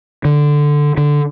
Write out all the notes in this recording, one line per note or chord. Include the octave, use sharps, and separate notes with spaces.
D3
D3